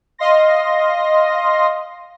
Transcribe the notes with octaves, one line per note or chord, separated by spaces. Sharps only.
D#5 F5 C6 A#6